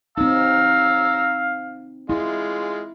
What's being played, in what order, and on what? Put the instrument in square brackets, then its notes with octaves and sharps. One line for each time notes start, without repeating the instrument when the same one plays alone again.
[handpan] C4 D#4 [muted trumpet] F5 [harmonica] A#5 E6
[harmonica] G#3 F4 [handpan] E4